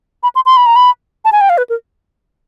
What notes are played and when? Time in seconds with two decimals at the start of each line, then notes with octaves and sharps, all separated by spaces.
0.23 B5
0.35 C6
0.46 C6
0.57 B5
0.66 A#5
0.76 B5
1.25 A5
1.33 G#5
1.41 G5
1.50 F5
1.58 B4
1.70 A#4